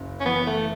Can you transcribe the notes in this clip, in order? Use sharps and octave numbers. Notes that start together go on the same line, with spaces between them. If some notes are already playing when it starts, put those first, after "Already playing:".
Already playing: F#1 F#2
C#4
E3 B3
A3